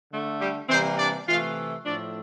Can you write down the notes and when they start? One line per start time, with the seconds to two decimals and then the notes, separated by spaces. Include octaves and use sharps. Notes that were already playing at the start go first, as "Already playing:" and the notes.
0.11 D3 A3
0.39 G3 G4
0.68 C3 E3 G3 A#3 C4 C5
0.98 D4 D5
1.27 C3 E3 A3 F4 F5
1.85 A2 F3 A3 D4 D5